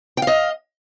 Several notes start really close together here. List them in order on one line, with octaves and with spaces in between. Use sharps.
G5 F5 D#5